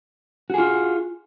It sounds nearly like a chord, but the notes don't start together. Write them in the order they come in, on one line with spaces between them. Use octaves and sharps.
F#4 G#4 F4